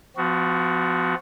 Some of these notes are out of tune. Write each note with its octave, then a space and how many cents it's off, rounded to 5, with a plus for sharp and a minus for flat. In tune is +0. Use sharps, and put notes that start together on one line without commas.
F3 +0 B3 +40 F#4 +0